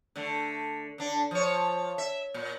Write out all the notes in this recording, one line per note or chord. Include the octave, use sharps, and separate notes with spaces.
D3 A3
D3 D4
F3 C#5
E5
A#2